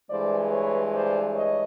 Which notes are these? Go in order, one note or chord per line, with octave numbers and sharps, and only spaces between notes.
G2 E3 G#3 C5 D5
B4 C#5
C5 D5
C#5 D#5